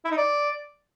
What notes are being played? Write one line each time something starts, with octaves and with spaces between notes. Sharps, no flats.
E4
D#4
D5